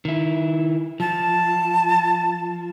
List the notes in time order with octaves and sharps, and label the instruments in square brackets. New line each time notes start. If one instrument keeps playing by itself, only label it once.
[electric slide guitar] D#3 E4
[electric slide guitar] F3 [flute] A5